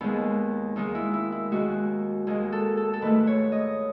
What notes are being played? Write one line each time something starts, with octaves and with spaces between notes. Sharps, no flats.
D#2 D#3 G#3 B3
D#2 D#3 G#3 D#4
E4
E4
E4
D#2 D#3 G#3 F#4
D#2 D#3 G#3 G#4
A4
A4
A4
G#2 D#3 A3 B4
C#5
D#5